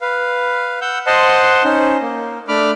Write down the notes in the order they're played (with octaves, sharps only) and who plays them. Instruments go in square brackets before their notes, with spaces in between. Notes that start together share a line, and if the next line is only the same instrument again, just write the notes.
[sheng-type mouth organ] B4 F5
F#5 E6 G6
C5 D#5 F#5 A5 C6
C#4 D#4 C5
A#3
A3 D4 B5 D6 F6